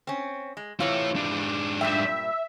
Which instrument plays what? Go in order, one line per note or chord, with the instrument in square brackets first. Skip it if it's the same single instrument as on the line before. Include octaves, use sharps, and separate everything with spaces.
[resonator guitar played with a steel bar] C4 C#4
G#3
[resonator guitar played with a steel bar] C3 E3 F4 [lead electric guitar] E4 C#5
[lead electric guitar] G#2 D4
[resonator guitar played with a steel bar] G2 A#2 G5 [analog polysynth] E5